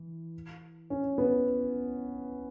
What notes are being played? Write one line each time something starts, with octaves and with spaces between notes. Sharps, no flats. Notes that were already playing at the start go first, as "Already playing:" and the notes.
Already playing: E3
C#4
B3